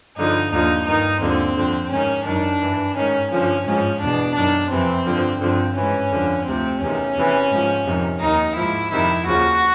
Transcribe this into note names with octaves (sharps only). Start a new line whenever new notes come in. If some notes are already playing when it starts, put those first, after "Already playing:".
G2 D3 F3 D#4
D#2 D3 F3 D#4
G2 D#3 D#4
D#2 D3 F3 C4
F2 D3 F3
G#2 D#3 C#4
F#2 D#3 D4
G2 E3
G#2 D#3 C#4
G2 D3 F3 C#4
G#2 F3 C#4
E2 B2 D4
F#2 D#3 D4
F2 C3 E3 C4
G2 D3 F3
G2 D3 F3 C4
G#2 E3 C#4
F2 D3 F3
D2 C3 F3 C4
E2 C3 D#3 C#4
E2 C3 E3
G#2 F3
F2 C3 D#3
D#2 D#3 D#4
G#2 F3 E4
F2 C3 D#3 E4
D#2 C#3 F3 F#4